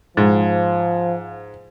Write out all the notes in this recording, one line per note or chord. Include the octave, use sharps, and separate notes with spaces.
G#2 F3